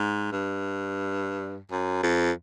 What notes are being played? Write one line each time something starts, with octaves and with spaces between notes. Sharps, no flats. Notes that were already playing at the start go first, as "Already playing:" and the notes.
Already playing: G#2
G2
F#2
F2